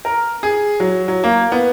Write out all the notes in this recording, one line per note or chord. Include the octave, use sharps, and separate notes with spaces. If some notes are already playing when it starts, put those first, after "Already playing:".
A#4
G#4
F#3
F#3
A#3
B3